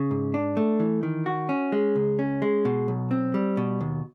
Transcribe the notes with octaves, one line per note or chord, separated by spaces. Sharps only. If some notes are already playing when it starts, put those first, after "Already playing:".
Already playing: C#3
G#2
D4
A3
E3
D#3
F#4
C#4
G#3
C#2
C#4
G#3
B2
B1
C4
G3
B2
D#2